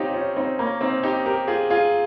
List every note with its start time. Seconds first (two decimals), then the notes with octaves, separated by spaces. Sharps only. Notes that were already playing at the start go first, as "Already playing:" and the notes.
Already playing: C4 C#4 D#4 F4 G4
0.14 C#4 F4
0.36 C4 D#4
0.58 A#3 C#4
0.81 C4 D#4
1.03 D#4 G4
1.26 G4 A#4
1.47 F4 G#4
1.70 F4 G#4